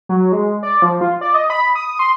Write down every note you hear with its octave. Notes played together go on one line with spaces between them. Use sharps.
F#3
G#3
D5
F3
F4
D5
D#5
B5
D#6
C6